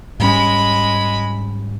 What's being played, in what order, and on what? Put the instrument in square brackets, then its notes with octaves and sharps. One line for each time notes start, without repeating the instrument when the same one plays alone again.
[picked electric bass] G#2 G3 C#4 [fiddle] G#3 B5